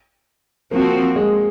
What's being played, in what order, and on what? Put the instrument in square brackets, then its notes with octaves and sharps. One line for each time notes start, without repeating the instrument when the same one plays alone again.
[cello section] F3 C4 F#4 [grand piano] A#3
[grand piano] G#3